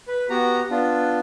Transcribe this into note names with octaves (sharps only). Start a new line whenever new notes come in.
B4
B3 F#4 G4 A#5
B3 D4 F4